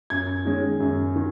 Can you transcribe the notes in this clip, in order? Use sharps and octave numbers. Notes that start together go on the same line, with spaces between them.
F#2 G#6
D#3 G#3 C#4
F#2
D#3